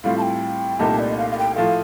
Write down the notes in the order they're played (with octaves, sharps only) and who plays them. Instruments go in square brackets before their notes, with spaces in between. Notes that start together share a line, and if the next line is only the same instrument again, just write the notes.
[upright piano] A2 G3 C4 F4 [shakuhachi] F5
[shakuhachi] A5
G5
[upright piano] C2 A#2 A3 D#4 G4 [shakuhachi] A5
[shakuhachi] D5
D#5
F5
F5
G5
[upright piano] A2 F3 A3 [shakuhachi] F5